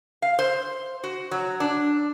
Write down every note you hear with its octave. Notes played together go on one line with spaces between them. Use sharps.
F5
C5
F#4
F#3
D4